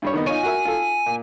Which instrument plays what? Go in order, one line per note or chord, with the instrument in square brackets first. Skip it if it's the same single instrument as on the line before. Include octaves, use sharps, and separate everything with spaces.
[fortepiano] G2 G3 C#5
D#3 B3 D#4
[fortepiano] D#4 F4 C#5 [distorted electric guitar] G#5
[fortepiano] F#4 A#4 E5
F4 A4
A#2